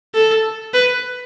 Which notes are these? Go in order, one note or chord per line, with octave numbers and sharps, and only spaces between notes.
A4
B4